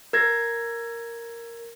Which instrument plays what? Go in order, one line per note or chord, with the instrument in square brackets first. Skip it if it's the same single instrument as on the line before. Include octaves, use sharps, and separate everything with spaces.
[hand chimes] A#4 G#6 A#6